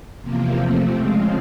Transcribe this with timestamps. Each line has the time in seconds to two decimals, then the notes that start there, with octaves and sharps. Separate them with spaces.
0.21 E2 C3 F3 A#3
0.57 C3 F3 A3 C4
0.93 C#3 F3 G#3 C4 F4